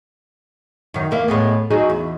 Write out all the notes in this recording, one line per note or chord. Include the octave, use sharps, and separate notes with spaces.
F#2 D#3
E2 A#3 E5
A2 G#3 B3
F#3 D#4 G#4
E2